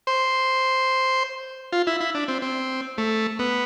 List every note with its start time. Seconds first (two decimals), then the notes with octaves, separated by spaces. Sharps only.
0.07 C5
1.73 F4
1.87 E4
2.01 E4
2.15 D4
2.28 C4
2.42 C4
2.98 A3
3.39 B3